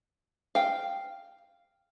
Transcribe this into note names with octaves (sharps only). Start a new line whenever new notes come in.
F5 G5